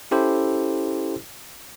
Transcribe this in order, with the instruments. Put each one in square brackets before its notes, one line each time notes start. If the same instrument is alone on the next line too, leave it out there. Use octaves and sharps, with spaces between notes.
[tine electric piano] C#4 E4 G4 A4 C5